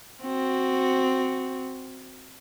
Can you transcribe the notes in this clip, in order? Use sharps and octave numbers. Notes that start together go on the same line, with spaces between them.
C4 F#4